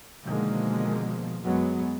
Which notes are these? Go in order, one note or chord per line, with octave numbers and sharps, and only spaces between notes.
B2 D3 D#3 F3 G#3 A#3
F#2 F#3 G#3 B3